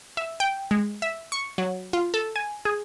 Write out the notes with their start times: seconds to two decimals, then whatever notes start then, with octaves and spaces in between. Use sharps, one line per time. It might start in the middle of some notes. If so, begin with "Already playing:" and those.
0.17 E5
0.40 G5
0.71 G#3
1.02 E5
1.32 C#6
1.58 F#3
1.93 F4
2.14 A4
2.36 G#5
2.65 G#4